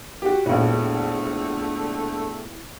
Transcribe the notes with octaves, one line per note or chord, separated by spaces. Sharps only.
F#4 G4
E1 A#1 D3 A3 E4